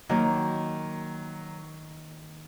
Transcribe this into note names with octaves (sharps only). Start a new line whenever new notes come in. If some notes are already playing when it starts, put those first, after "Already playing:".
D#3 F#3 A#3